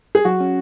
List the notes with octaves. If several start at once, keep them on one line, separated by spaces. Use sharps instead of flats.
G#4
F#3 F#4
C#4